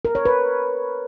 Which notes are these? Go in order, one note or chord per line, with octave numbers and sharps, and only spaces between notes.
A#4
C#5
B4